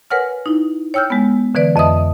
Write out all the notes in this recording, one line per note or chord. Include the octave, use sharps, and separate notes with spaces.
A#4 B4 C#5 F#5 G#5 F6
D#4 E4
C#5 G5 E6 F6 G6
G#3 B3
D3 E3 B4 D5
F2 D#5 E5 D#6